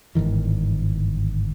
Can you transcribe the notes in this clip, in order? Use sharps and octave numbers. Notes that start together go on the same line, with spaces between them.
G1 G#2 D#3 E3